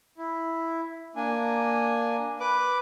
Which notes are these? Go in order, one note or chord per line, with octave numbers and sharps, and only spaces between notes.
E4
A#3 D4 G#5
B4 D6